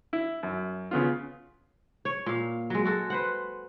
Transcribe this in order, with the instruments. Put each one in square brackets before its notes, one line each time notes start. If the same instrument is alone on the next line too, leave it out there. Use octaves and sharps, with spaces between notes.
[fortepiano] E4
F#2
C#3 B3 F4
[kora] C#5
A#2 F5
F#3 G#3
G#3 F#4 A4
B4 C5 F#5